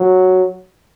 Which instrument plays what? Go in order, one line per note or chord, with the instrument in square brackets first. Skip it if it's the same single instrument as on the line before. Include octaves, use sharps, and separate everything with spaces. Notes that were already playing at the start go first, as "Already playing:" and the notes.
Already playing: [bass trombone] F#3